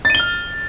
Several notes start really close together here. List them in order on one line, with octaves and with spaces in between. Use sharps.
A6 D#7 G7 F6